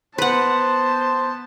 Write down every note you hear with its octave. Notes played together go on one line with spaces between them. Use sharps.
B3 B4 C5 F#5 A5